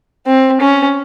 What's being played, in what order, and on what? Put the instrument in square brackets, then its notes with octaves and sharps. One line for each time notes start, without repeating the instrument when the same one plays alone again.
[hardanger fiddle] C4
C#4